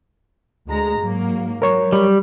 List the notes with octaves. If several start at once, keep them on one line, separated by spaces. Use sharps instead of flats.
D2 G#3 A#5
G#2 F#3 A#3
F#3 A#4 C#5 C#6
G3